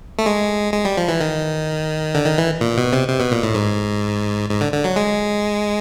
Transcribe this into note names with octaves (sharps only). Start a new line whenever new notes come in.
A3
G#3
G#3
G3
F3
E3
D#3
D3
D#3
E3
A#2
B2
C3
C3
B2
A#2
A2
G#2
G#2
D3
D3
F#3
G#3